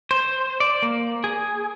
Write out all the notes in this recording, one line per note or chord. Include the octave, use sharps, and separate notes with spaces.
C5
D5
A#3
G#4